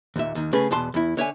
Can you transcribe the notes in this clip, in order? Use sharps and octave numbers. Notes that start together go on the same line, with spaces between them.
D#2 A#2 E5
D#2 D#3
C#3 A3 C#4 G#4 B4
E2 B2 A5 C6
E2 E4
D3 C#5 E5 G#5